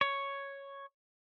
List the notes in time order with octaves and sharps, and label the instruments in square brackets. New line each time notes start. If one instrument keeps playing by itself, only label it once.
[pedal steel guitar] C#5